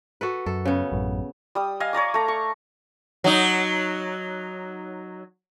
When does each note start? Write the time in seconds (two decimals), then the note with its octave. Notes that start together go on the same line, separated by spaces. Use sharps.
0.21 F#4 A4 B4
0.46 F#2 A4
0.65 C#3 B3
0.92 A1 F#2
1.55 G3 D#6
1.80 D#5 F5 G#5
1.93 C#5 D5 A#5 D6
2.14 A3 A#5
2.28 C#6
3.24 F#3 D#4